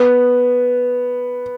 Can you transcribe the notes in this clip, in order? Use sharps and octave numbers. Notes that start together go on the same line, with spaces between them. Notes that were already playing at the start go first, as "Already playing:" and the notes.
Already playing: B3